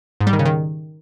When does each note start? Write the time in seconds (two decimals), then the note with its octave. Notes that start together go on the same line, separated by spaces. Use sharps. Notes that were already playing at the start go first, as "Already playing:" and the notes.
0.21 G#2
0.27 G3
0.33 D#3
0.39 C#3
0.46 D#3